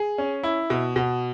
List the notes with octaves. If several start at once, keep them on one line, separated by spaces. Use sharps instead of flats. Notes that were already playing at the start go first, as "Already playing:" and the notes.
Already playing: G#4
C#4
E4
B2
B2